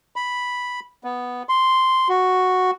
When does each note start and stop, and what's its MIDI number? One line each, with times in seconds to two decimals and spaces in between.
0.16 0.80 83
1.04 1.43 59
1.49 2.08 84
2.09 2.71 66